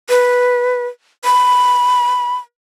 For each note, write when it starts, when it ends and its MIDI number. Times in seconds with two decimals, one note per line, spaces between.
0.09 0.87 71
1.25 2.37 83